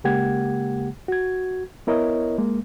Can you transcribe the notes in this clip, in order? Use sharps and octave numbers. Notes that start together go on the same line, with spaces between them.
C#3 G#3 A#3 G4 F#5 G#6
F#4 G#6
B3 E4 A#4 C#5 D#5
G#3 A#3